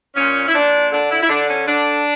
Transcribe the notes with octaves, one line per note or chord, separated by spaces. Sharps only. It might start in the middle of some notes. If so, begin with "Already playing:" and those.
A#2 C#4
E4
A#2 D4
D3 D4
E4
E4
D3 D4
C#4
D3 D4